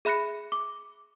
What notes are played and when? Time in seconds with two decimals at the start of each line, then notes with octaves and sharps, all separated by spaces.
0.05 G#4 E5 B5 F#6 A#6 C#7
0.52 D6